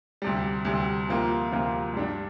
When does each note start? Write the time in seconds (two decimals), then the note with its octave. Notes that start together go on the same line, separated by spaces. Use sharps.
0.22 D2 C3 G3
0.65 D2 C3 G3
1.08 D2 C3 F3 A#3 F4
1.52 D2 C3 F3 A#3 F4
1.94 G2 G3 D4